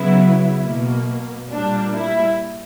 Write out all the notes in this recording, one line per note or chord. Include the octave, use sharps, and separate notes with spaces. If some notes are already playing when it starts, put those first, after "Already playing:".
Already playing: C#3 F#3 B3 E4
B2 A#3
A#2 G3 A#3 D4
E4